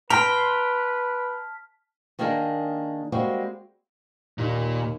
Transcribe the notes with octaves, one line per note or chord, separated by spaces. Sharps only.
B4 G5 A5 A#5 C6 F6 B6
D#3 A#3 D4 D#4 G#4 A#4
G3 G#3 A#3 C4 F#4
D#2 A#2